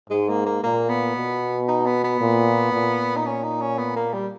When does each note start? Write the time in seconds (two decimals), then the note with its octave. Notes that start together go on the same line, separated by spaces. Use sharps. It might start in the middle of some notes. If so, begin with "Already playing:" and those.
0.10 G#2 G#3
0.29 A#3
0.46 A#3
0.63 A#2 A#3
0.89 B3
1.16 B2
1.68 D#4
1.86 B3
2.04 B3
2.21 A#2
2.73 A#2
3.16 D#4
3.26 C#4
3.43 D#4
3.61 C#4
3.78 B3
3.96 A#3
4.13 G3